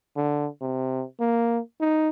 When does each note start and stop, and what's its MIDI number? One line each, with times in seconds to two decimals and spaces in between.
0.16 0.48 50
0.61 1.04 48
1.20 1.60 58
1.80 2.10 63